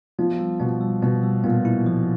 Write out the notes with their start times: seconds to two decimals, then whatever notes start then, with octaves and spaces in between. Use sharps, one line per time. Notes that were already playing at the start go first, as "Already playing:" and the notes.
0.18 F3 B3
0.39 G3
0.60 B2 B3
0.81 G3
1.02 B2 B3
1.23 G3
1.44 A#2 B3
1.65 E4
1.86 F3